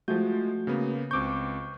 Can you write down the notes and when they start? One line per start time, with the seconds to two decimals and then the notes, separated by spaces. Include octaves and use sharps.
0.08 F3 G#3 A3 F#4 G6
0.67 C#3 A#3 B3
1.11 C#2 C4 C#6 D6 G6